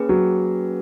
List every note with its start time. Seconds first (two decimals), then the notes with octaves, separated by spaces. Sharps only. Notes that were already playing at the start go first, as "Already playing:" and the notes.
Already playing: A#3 C#4 G#4 B4
0.09 F#3